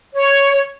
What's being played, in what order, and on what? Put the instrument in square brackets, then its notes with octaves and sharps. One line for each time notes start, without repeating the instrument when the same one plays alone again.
[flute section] C#5